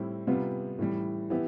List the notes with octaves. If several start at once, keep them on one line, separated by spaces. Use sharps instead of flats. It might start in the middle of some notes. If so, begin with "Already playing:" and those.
Already playing: A2 G3 C4 E4
C3 G3 B3 F4
A2 E3 G3
E3 B3 E4 G4